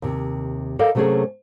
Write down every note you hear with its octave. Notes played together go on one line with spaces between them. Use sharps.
D#2 C3
A4 A#4 D5 D#5 F5
C3 F#3 A3 A#3 C#4 G#4